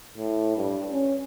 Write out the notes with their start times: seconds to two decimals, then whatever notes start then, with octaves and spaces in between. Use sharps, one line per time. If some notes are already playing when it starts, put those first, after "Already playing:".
0.17 A2
0.57 G2
0.92 C#4